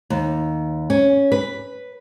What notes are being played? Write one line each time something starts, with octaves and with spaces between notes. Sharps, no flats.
D#2
C#4
B4